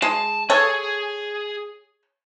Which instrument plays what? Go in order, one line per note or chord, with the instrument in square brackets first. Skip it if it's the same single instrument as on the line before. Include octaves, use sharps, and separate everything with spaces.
[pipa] G#3 [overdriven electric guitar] A5
[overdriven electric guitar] G#4 [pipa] A4 C#5